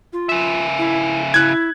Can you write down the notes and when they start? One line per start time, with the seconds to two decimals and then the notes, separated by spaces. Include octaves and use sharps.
0.13 F4
0.29 C#3 E5
0.79 E4
1.34 E4 F#6 G#6